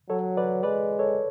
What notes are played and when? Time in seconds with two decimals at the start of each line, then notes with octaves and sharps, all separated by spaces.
0.10 F#3 A4 C#5
0.37 B4 D5
0.63 G#3 B4 D5
0.99 A4 C#5